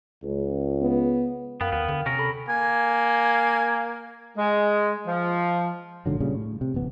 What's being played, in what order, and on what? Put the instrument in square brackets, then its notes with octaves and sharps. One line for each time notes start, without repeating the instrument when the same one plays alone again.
[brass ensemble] C#2
[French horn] B3
[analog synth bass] F#2 [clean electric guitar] B3 [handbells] A#4 F5 G5
[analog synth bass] D#2 [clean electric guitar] B3
[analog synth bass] D3
[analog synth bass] C3 [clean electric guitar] C#4 A#4
[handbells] A4 B5
[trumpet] A#3 [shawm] G#5
[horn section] G#3
F3
[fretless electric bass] A#1 G#2 D3 F#3
A#2 C#3 G3
A2
C3
D1 A1 B3